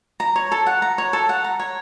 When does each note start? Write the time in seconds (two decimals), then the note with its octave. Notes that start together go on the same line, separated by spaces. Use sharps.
0.20 A#5
0.36 C#5
0.52 A4
0.66 F#5
0.82 A#5
0.98 C#5
1.13 A4
1.29 F#5
1.44 A#5
1.60 C#5